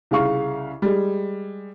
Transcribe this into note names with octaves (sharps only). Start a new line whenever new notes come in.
C2 C#3 F5 C#6
G3 G#3